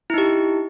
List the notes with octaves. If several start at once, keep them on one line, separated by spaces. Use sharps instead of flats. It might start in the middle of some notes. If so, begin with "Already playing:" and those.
D#4 E4 G4